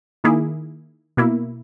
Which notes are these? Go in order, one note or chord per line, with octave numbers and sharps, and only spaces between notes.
D#3 A#3 E4 G#4
B2 A#3 E4